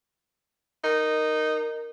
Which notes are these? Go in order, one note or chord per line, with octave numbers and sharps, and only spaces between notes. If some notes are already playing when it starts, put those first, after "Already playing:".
D#4 A#4